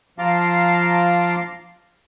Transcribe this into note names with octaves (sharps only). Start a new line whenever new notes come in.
F3 F5 A5 A#5 C6 D6